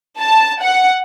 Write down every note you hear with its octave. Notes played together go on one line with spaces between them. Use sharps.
A5
F#5